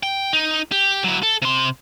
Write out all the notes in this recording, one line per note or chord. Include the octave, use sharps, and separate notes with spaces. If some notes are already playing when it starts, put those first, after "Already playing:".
G5
D#4
G4
F#3 E4
A4
C3 C6